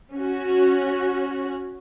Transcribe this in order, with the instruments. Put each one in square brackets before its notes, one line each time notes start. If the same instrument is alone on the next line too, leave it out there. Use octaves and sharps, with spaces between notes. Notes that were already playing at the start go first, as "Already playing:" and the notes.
[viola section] C#4 F#4